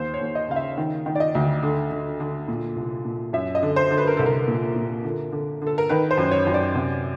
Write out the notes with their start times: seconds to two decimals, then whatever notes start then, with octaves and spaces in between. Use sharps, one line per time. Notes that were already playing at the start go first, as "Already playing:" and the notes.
Already playing: D#2 C5
0.14 C#5
0.21 D#2
0.35 D#5
0.49 C#3 F5
0.56 E5
0.78 D#3
1.06 D#3
1.15 D5
1.20 D#5
1.35 D2
1.63 D3
1.91 D3
2.20 D3
2.48 A#2
2.76 C2
3.05 A#2
3.33 F#2 E5
3.55 D#5
3.62 D3
3.76 C5
3.91 D3
3.98 B4
4.07 A#4
4.17 C2 A4
4.26 A#4
4.48 A#2
4.76 A#2
5.04 D3
5.32 D3
5.62 D3
5.67 A4
5.78 A#4
5.89 D#3 B4
6.11 C5
6.18 F#2
6.31 C#5
6.47 F#2
6.54 D5
6.75 C3